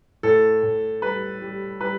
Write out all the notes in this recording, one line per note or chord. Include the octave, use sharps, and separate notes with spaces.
A2 A4
A2
G3 B4
G3
G3 B4